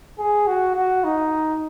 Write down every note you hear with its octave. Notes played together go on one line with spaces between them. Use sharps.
G#4
F#4
F#4
D#4